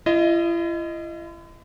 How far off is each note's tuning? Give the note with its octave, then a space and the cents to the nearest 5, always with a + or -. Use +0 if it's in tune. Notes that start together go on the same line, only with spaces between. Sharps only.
E4 +45 D#5 +0